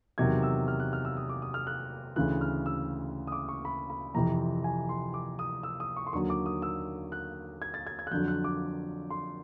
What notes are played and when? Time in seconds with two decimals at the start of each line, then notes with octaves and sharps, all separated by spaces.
0.18 E2 C3 D#3 F#3 G#6
0.43 E6
0.68 F6
0.80 F#6
0.93 F6
1.05 E6
1.17 D#6
1.29 D6
1.42 D#6
1.54 F6
1.67 F#6
2.16 D2 C#3 E3 F#6
2.41 F6
2.66 E6
3.27 D#6
3.32 D6
3.49 C#6
3.65 B5
3.90 B5
4.14 F2 C3 E3 A#5
4.64 G#5
4.89 C6
5.14 D6
5.39 D#6
5.63 E6
5.80 D#6
5.96 C#6
6.07 C6
6.13 D#2 D3 F#3 C#6
6.30 D6
6.46 D#6
6.62 E6
7.12 F#6
7.62 G#6
7.74 A6
7.87 G#6
7.99 G#6
8.07 F#6
8.11 F2 D3 F#3 G6
8.28 F#6
8.44 D6
9.10 C6